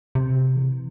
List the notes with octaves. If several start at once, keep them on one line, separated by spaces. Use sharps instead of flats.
C3
E3